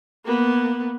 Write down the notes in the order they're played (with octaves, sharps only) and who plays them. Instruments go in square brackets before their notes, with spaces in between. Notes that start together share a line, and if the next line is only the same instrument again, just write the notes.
[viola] A#3 B3